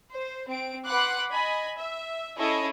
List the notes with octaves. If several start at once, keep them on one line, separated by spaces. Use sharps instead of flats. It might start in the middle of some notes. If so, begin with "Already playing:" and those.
C5
C4 D7
B4 F#5 B5 C6 D6 F#6
D#5 G#5 B5
E5
C#4 E4 G#4 A4 C#5 D#5